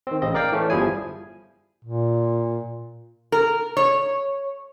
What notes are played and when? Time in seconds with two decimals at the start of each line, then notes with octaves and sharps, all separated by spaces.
0.07 D#3 C4
0.22 A1 C#3 C4 D#5
0.34 A#4 D5 F5 G5
0.52 E3 A3 C#4
0.70 G1 F3 G3 E4 G#4 G#5
1.85 A#2
3.32 A#4
3.77 C#5